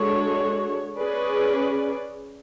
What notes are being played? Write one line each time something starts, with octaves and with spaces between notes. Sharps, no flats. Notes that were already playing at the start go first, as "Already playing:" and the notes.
Already playing: G#3 D4 F#4 A4 C#5
C#4 G#4 B4 D5